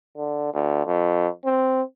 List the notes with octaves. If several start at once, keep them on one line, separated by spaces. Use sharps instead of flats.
D3
D2
F2
C4